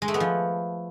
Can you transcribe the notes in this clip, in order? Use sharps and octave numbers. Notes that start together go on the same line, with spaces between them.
G#3
A3
B3
F3